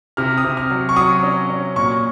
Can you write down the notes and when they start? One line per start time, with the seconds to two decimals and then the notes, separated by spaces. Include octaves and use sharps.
0.17 C3 F6
0.38 D#6
0.44 C3
0.57 F6
0.70 F#3
0.89 C#6
0.96 F#3 D#6
1.23 C#4
1.50 C#4
1.76 A#2 C#6